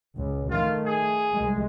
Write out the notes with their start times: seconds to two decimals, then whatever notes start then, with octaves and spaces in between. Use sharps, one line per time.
0.15 C#2
0.50 D#3 A3 F4
0.86 G#4
1.35 C2 G#3